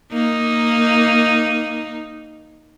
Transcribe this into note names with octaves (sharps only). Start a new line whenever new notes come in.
A#3 D#4